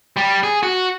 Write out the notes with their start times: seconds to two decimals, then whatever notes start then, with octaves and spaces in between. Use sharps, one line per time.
0.17 G3
0.43 G#4
0.63 F#4